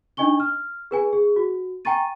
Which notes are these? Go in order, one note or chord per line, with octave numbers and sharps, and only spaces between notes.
D4 D#4 D#5 G#5 C#6 G7
F6
G#4 B4 G#5
G#4
F#4
G5 G#5 A#5 C#6 A6 D#7